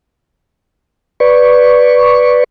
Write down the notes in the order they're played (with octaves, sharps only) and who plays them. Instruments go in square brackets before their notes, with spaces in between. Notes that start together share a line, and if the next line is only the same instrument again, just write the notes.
[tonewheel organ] B4 D5 C#6